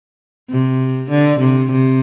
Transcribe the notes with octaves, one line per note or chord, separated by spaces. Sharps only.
C3
D3
C3
C3